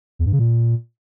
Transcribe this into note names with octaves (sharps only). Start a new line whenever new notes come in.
E2
G2
C#3
A#2